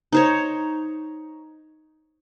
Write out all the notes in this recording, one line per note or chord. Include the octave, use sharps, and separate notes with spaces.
D#4 C5 C#5